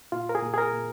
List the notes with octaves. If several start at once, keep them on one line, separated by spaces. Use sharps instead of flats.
A#2 F4
A#4
G#4
A#2
G#4
A#4
A#2